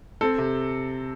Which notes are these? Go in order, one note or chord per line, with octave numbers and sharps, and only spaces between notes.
C4 A4
C3